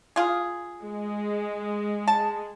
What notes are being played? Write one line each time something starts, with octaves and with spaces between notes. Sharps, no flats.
F4 G#4
G#3
A5